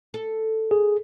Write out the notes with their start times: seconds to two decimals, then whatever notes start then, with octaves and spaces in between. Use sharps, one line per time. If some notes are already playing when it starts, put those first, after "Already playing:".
0.14 A4
0.71 G#4